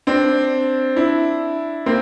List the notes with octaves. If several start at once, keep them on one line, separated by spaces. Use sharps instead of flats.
C4 D4
D4 E4
A#3 C4